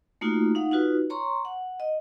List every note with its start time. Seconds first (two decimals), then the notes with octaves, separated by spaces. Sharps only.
0.21 A3 A#3 D#4 F4 F#4
0.55 D#4 F5 F#5
0.71 D#4 F4 F#4 B4
1.10 C#5 A#5 C6 C#6
1.45 F#5
1.80 D#5